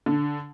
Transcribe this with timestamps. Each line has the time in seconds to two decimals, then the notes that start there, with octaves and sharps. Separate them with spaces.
0.06 D3